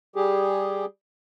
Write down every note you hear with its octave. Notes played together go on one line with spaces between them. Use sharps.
G3 G4 G#4